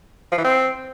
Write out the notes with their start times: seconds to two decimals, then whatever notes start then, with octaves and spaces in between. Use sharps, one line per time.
0.32 F3
0.38 E3
0.44 C4